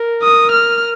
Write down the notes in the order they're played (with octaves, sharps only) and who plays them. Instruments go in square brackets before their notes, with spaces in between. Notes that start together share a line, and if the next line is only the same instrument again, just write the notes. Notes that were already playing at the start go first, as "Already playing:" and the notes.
Already playing: [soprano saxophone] A#4
[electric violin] D#6
F6